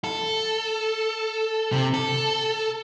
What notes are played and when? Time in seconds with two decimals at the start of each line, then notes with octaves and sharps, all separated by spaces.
0.04 A4
1.72 C3
1.94 A4